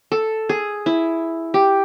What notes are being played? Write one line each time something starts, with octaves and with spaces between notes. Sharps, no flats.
A4
G#4
E4
G4